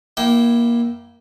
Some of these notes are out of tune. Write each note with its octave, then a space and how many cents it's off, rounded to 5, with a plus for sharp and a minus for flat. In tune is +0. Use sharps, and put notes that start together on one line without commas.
A#3 +20 E4 +0 G5 -20